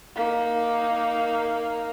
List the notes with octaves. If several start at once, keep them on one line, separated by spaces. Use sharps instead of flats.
A#3 D#4